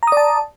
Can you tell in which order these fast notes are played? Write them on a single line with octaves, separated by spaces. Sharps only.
A#5 D#6 D5 A5